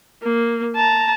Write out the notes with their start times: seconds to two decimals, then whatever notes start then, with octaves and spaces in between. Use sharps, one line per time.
0.23 A#3
0.76 A5 A#5